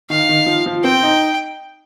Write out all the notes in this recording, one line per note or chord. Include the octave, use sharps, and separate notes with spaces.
D#3 F5
D#3
F3
F3
C4 G5
D#4